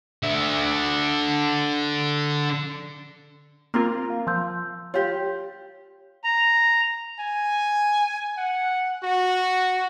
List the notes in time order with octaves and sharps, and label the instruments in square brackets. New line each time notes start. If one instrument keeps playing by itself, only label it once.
[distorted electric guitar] D3 E5
[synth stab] A#3 C4 F4 [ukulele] A#4
[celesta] F5
[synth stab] F3 [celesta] C6 E6 G6
[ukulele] F4 G4 [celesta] C#5
[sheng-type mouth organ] A#5
[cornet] G#5
F#5
F#4